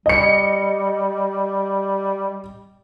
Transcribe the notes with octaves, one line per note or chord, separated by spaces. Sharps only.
G3 D#5 C#7